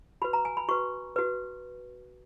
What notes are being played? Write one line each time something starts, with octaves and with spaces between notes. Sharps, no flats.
F#4 B4 B5
A#5
G#5
B5
F#4 B4 C#6
F#4 B4